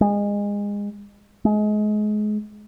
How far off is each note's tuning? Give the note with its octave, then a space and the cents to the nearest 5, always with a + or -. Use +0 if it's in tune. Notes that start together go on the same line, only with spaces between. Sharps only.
G#3 -25
G#3 +30